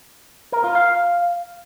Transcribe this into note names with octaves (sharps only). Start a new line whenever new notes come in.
A#4
F4
F5